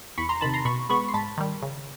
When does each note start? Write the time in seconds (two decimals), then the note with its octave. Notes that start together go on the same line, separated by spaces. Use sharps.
0.18 E2 B5 C#6
0.29 A#5 C6
0.41 C3 D#3 A5 B5
0.54 A#5 C6
0.65 B2 B5 C#6
0.89 G#3 B3 B5 C#6
1.09 C6
1.13 G#2 A5 B5
1.38 D#3 G3
1.63 C#3